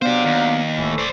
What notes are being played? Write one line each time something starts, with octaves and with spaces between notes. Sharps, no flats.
F#3 B3 D4 G4 C5 F5
D#2
D1 E3 A3
C5 D5